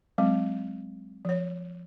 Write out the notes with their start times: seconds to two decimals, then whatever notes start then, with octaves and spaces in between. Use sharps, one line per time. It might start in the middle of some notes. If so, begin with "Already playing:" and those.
0.18 F#3 G#3 C4
1.25 F3 C#5